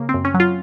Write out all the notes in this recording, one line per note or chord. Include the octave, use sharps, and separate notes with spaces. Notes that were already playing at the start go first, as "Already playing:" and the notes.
Already playing: C#3 A#3
C4
F#2
C#4
F#3
F4